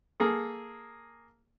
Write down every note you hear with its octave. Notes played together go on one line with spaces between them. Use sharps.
A#3 G#4 A4